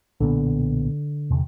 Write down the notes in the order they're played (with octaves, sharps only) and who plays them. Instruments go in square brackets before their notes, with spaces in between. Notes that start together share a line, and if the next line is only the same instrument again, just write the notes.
[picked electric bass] B1 A#2 B3 [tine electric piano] D3
[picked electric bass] E2 C3